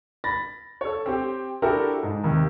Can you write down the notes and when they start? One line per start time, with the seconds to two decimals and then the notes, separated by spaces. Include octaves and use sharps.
0.24 B5 A6 A#6
0.81 A4 C#5
1.06 C4 G4
1.62 D4 E4 F#4 G4 A4 A#4
2.03 G#2
2.24 D#2 C3